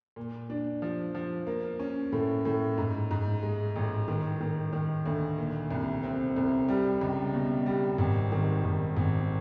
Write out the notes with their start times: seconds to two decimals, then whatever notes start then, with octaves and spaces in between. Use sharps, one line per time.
0.16 A#2
0.50 D4
0.82 F3
1.15 F3
1.47 A#3
1.79 C#4
2.12 A2
2.45 A2
2.78 G#2
3.11 G#2
3.43 G#3
3.76 A1
4.08 D#3
4.40 D#3
4.73 D#3
5.06 D2
5.38 A#2
5.71 C2
6.03 C4
6.36 C2
6.68 G3
7.01 C#2
7.33 B2
7.66 G3
7.98 G#1
8.32 D#3
8.64 G#1
8.97 G#1